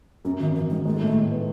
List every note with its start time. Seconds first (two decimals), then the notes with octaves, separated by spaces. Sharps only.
0.25 F#2 C#4
0.40 G#1 D#3
0.56 G#1 E3
0.70 D#3 G#3
0.85 G#3 A3
1.01 A2
1.16 A2
1.31 B3